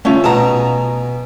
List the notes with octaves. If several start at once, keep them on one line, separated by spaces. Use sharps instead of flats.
A3 C#4 F4
B2 G#4 A5 A#5